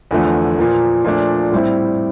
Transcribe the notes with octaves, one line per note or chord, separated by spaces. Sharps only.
E2 D3 F3 A3
A#2 F3 A#3
A#2 F3 A3 D4
A2 G3 C4 E4